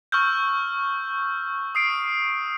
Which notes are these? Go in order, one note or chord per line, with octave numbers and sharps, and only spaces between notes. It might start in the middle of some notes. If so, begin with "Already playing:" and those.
C#6 E6 F6 G6
D#6 C7 D7